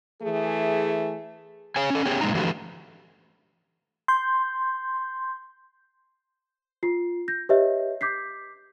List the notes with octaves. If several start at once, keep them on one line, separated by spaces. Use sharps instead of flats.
E3 A3 G#4
G#4 C#5 G#5
C#4 A4
B3 C#4 G4 G#4
G2 A#2 G#3 B3 D#4 A#5
D3 E3 F3 A3 F#4 G4
C6 G6
F4 C7
G6 A#6
G4 B4 C#5 D#5 E5
D6 G6 B6 C7